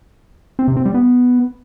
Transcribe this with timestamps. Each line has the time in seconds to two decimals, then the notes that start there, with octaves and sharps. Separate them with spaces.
0.59 C4
0.68 C3
0.77 C4
0.85 G3
0.94 B3